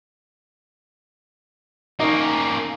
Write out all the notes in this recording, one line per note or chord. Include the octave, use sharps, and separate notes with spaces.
A#3 C#4 D#4